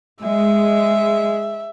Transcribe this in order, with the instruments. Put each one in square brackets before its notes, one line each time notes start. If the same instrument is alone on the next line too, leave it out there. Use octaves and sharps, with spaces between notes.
[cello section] G#3 [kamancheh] E5